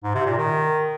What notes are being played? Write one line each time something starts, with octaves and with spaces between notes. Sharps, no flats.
G#2
C3
A#2
D#3